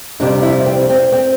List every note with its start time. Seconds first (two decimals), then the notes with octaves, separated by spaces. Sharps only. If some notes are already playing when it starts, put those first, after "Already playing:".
0.20 F2 C3 G3 D4
0.43 E4
0.66 C4
0.89 C4
1.12 C4